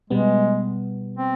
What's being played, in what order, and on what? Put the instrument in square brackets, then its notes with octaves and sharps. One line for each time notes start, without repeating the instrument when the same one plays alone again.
[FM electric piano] B2 G3 B3 [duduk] G#3
[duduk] C4